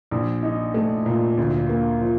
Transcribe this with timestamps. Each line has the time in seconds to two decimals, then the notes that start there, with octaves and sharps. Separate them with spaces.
0.11 A#1
0.43 D#4
0.74 A3
1.06 A#2
1.37 D2
1.69 A#3
2.01 F3